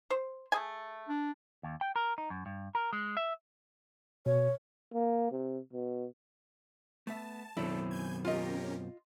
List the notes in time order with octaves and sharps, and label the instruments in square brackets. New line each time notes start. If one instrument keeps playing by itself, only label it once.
[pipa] C5
A3 G#4 G#5
[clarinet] D4
[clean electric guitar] D#2
G5
A#4
D#4
F#2
G2
A#4
G#3
E5
[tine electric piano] B2 [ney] C#5
[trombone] A#3
C3
B2
[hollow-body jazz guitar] A3 B3 E5 [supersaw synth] A5
[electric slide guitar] F#2 B2 C4 [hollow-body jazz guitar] D#3 F#3 [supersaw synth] D4 A4 [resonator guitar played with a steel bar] E4
[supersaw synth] G#5 G6 G#6
[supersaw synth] C#4 G4 A#4 [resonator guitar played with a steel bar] F4 D#5